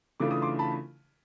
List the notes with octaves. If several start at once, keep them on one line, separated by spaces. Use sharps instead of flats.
C#3 E3 A3 D4 F4 D6
D#6
C6 D6
A5 B5